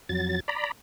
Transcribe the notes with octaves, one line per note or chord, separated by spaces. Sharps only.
F2 F#3 A6
D5 A#5 B5